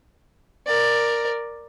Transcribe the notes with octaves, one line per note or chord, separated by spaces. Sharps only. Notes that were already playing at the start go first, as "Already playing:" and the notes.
A#4 D5